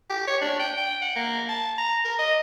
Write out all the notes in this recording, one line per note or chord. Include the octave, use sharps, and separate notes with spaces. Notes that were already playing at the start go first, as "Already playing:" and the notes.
G4
C#5
D4
G5
G5
F#5
A#3
A5
A#5
A#4
D#5